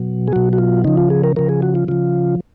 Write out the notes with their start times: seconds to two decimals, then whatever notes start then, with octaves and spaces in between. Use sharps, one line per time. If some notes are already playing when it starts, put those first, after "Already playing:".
Already playing: B2 F#3
0.28 G#4
0.32 B2 F#3 F#4
0.53 F#4
0.58 F4
0.84 C#3 F3 D#4
0.97 F4
1.10 G#4
1.24 A#4
1.36 C#3 F3 A#4
1.49 G#4
1.62 F#4
1.75 F4
1.88 C#3 F3 F4